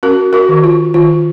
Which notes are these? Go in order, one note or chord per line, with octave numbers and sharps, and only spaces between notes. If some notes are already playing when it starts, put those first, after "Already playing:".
C#4 F#4 A#4
F#4 A#4
D#3
F4
D#3 F4